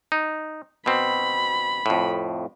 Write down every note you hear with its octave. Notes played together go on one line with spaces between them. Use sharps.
D#4
B2 C4 B5
F2 A2